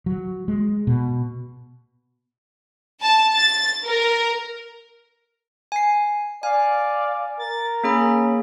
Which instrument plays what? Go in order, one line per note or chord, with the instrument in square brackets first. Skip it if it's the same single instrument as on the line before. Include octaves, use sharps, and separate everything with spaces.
[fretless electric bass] F#3
G#3
B2
[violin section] A5
A6
A#4
[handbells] G#5 C7
[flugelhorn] D5 [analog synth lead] F5 [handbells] G#5
[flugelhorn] A#4 [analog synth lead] A6
[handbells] A#3 G#4 B5 [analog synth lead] C#4